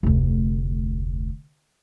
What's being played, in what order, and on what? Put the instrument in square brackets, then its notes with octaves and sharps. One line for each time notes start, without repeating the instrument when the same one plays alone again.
[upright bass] F1 D2